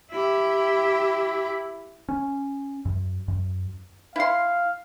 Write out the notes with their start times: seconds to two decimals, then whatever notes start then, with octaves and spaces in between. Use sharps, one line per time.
0.10 E4 G4
2.09 C#4
2.85 F#2
3.28 F#2
4.16 E4 F5 C6